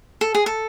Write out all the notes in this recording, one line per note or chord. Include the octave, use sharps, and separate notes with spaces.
A4
G#4
A4